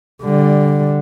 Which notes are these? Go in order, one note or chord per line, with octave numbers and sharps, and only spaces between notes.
D3 G3